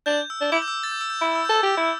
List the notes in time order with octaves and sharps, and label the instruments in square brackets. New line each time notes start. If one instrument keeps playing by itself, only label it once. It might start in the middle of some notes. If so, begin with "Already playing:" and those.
[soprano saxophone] D4 [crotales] G6
[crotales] E6
[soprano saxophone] D4
[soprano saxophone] E4 [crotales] D6
[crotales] G6
E6
A6
G6
E6
G6
[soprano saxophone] E4
[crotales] E6
[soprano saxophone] A4 [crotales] G6
[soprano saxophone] G4 [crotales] E6
[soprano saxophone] E4